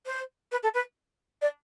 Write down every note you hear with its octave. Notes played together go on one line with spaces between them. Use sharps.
C5
B4
A4
B4
D5